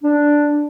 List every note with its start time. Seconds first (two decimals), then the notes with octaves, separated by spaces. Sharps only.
0.03 D4